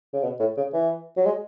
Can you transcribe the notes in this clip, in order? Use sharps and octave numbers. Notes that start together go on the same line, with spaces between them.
C#3
B2
A2
C#3
E3
F#3
G#3